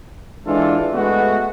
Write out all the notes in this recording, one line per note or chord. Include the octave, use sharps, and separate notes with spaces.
E3 G#3 D4 F4 A4
G#3 A3 B3 F#4